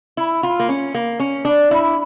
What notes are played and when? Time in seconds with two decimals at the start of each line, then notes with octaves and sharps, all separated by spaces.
0.17 E4
0.43 F4
0.60 A#3
0.69 C#4
0.94 A#3
1.20 C#4
1.45 D4
1.71 E4